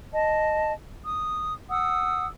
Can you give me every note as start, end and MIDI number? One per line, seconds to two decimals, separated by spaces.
0.13 0.73 75
0.13 0.73 81
1.05 1.52 87
1.70 2.27 78
1.70 2.27 87
1.70 2.27 88